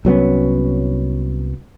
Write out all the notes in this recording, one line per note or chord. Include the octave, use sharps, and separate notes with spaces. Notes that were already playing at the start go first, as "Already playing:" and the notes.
C2 F#3 B3 C#4